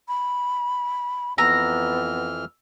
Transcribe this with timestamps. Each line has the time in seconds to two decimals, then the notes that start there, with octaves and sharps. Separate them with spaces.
0.08 B5
1.38 F2 E3 B3 A#5 E6 F6